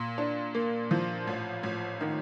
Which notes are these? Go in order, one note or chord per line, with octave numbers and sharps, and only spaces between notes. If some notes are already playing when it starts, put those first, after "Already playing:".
Already playing: A#2
D4
A#3
F3
A1
A1
D#3